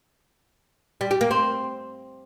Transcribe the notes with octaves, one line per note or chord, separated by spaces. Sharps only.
G3
G4
A#3
C4